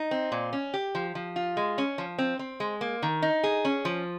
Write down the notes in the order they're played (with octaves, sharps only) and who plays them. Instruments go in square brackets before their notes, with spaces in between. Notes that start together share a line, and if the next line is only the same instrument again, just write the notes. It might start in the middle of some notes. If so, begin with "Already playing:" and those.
Already playing: [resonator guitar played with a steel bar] D#4
C4
A#2
C#4
G4
F3
F3
F4
G#3
C#4
F3
C4
C4
G#3
A#3
D#3
D#4
G#4
C#4
F3